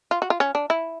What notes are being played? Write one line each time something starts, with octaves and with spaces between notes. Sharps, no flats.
F4
F#4
F4
C#4
D4
E4